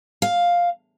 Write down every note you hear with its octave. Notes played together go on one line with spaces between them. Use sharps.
F5